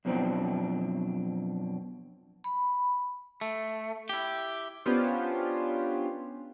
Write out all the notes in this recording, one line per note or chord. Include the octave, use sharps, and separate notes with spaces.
F#2 B2 F3 C4 D4
B5
A3
E4 G4
B3 C#4 D4 F4 G4 C5